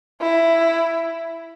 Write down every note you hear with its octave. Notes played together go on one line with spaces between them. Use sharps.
E4